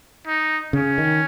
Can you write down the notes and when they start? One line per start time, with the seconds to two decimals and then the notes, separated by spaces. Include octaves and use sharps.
0.27 D#4
0.73 C#3 C#4
0.98 D#3